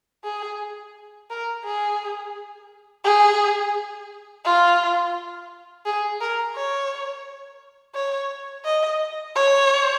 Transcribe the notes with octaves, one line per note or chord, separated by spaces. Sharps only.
G#4
A#4
G#4
G#4
F4
G#4
A#4
C#5
C#5
D#5
C#5